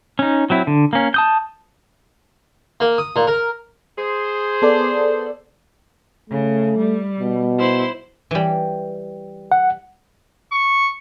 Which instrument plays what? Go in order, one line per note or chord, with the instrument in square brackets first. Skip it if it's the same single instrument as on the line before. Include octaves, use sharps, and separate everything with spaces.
[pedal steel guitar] C#4 D#4
F#3 C4 E4
D3
A#3 C#4
A5 D#6 G6
[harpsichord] A#3
D#6
A#2
A#4
[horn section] G#4 C5
[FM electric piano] B3 A4 D5
[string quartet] C#3 [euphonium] A3
[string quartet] G3
[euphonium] B2
[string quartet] E4 C5 C6
[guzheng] E3 G3
[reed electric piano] F#5
[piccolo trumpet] C#6